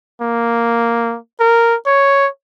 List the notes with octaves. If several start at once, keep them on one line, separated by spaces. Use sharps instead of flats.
A#3
A#4
C#5